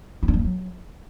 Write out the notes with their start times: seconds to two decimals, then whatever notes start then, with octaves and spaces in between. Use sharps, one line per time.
0.23 E4
0.28 D4
0.34 G3
0.39 A3
0.44 F#3